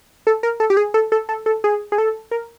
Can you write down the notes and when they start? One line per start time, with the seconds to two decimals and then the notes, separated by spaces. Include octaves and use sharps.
0.27 A4
0.43 A#4
0.60 A4
0.70 G4
0.77 G#4
0.94 A4
1.12 A4
1.29 A4
1.46 A4
1.64 G#4
1.92 G#4
1.98 A4
2.31 A#4